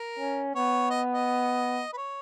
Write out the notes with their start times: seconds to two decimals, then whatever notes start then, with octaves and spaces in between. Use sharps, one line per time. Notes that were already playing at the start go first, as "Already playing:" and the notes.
Already playing: A#4
0.19 C#4
0.55 B3 C#5
0.90 D#5
1.13 D#5
1.93 B4
1.97 C#5